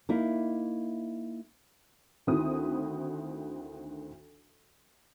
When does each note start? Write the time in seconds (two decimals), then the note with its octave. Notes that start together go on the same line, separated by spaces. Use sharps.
0.09 A#3 D#4 E4
2.27 D2 D#3 C4 E4 F#4 D#6